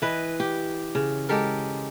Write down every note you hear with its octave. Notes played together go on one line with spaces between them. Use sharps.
E3 B4 D#5
G4
C#3
G#3 G4 A4 A#4